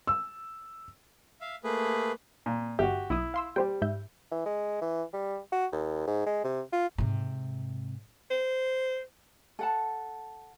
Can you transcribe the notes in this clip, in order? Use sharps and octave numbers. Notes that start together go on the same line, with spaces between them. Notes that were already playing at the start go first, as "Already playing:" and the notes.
E6
E5 F5
A3 A#3 G#4 B4
A#2
G1 F#4 G4 E5
B1 E4 D#6
F5 C6 E6
G3 G4 C5 G5
G#2 E5 G6
E3
G#3
E3
G3
F#4
D#2
G#2
G#3
C3
F4
G#2 C3
C5
A4 F#5 A5